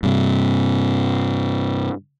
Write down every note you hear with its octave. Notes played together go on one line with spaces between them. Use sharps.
G2 C3